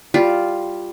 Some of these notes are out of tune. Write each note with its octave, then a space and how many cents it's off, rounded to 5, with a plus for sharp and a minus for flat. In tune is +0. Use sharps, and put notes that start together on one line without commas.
G3 +0 F4 +0